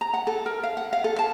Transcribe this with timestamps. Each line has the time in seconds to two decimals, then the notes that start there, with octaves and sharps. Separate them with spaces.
0.01 A#5
0.13 F#5
0.27 A4
0.46 A#4
0.63 F5
0.77 F#5
0.93 F5
1.04 A4
1.19 A5